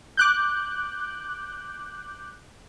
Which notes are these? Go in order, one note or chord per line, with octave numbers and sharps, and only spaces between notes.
D6 F#6 G6